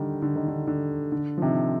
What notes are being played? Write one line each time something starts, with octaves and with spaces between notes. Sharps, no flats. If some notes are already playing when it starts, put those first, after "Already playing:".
Already playing: D3 D#3 G3
D3
D#3
D3
D3
D3
F3
C3 D#3